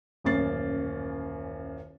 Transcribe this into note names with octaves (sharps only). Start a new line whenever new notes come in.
D#1 A1 F#2 A#3 A6 C7